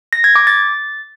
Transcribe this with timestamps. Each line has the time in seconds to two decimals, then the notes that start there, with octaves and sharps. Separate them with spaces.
0.13 A#6
0.24 G#6
0.36 D6
0.47 A6